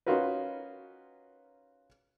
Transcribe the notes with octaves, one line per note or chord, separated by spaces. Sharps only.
C#4 D#4 F4 F#4 A#4 B4